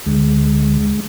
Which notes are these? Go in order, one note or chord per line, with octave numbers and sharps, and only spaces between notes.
D2 D3 G#3